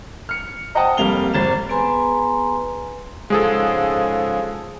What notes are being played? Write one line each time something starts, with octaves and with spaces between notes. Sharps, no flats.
F6 C#7
C5 D#5 F#5 G5 A5 D#6
F1 G3 A#3 F7 G7
G#1 A6 E7
B3 G#4 B4 G#5 A#5 C6
G#2 C#3 F3 G#3 G#4 A4